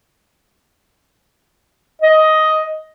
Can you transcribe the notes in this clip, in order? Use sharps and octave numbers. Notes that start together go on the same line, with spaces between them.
D#5